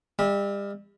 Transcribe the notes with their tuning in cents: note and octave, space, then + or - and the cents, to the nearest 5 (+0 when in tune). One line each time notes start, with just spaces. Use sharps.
G3 +35 E5 -20